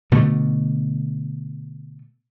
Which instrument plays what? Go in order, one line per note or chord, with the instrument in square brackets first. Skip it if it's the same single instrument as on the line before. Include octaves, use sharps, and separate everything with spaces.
[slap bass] B2 D3 A3